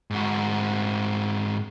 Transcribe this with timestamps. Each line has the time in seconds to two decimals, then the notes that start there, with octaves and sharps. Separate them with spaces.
0.11 G#2 F#4